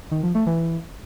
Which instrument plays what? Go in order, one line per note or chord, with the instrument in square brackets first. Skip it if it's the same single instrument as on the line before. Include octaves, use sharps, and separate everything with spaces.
[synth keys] D#3
F3
A3
E3